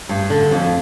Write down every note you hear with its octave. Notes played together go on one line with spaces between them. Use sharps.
G2
D3
F2